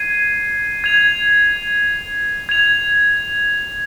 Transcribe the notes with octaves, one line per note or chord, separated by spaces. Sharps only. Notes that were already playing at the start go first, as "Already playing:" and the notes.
Already playing: G#6 C7 D#7
G#6 F7
G#6 F7